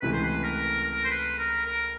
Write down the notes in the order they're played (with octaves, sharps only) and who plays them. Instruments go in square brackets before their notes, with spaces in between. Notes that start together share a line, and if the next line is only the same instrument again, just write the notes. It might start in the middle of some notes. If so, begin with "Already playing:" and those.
[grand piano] C#2 C3 E3 A3 [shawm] B4
[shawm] C5
B4
A#4
A#4
C5
B4
A#4
A#4